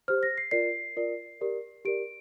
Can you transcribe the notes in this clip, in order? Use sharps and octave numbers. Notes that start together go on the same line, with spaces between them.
G4 C5 F6
A#6
C7
F4 A#4 D5 C7
F4 A#4 D5
G4 A#4 D5
G4 A#4 D5 D7